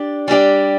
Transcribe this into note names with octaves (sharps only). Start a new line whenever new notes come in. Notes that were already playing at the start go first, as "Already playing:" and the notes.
Already playing: D4 G4 D5
G3 D4 G4 D5